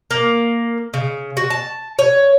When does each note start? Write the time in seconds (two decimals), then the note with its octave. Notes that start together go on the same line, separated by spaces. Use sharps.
0.11 A#3
0.94 C#3
1.37 F#4
1.50 A5
1.99 C#5